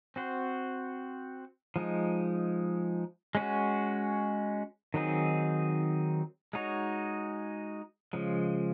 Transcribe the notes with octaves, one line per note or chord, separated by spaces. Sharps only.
C4 F#4 C5
F3 G#3 D#4
G#3 C#4 F#4
D#3 F#3 C4 D#4 G#4
G#3 D#4 F#4 C#5
C#3 F3 G#3